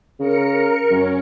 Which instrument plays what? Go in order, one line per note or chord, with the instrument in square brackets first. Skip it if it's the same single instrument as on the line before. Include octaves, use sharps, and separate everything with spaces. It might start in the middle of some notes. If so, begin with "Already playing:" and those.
[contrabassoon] C#3 [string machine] A#4 C#7
[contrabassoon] F#2 [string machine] C#4